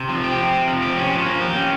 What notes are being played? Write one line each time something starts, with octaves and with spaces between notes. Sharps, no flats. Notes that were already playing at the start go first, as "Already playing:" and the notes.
Already playing: C3
F3
G4
C4
C3
F3
G4
C#4
F3
A#3
G4
C#4